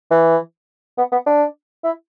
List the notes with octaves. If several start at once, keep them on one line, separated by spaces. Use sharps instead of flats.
E3
B3
B3
D4
E4